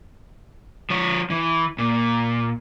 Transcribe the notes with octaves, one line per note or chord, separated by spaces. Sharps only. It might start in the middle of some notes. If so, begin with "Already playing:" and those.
F3 C#5
E3
A#2